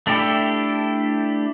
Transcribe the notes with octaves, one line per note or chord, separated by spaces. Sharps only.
A3 D4 E4 G4 A4